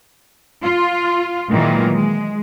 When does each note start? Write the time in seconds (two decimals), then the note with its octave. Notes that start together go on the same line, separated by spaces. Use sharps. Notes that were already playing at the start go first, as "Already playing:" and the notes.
0.63 F4
1.51 A#2 D#3 E3 F#3 G#3 A#3
1.92 G#3